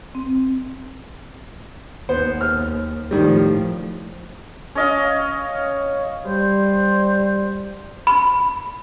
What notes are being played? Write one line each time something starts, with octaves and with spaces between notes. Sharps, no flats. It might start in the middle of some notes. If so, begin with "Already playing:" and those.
C4
D#2 B3 C5
F6
A2 D#3 F3 G3
C#4 D#5 F5
G3 C5
B5